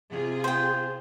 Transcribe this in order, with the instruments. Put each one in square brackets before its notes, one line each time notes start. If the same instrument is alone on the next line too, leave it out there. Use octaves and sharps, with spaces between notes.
[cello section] C3 F4 G#4
[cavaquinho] C5 G5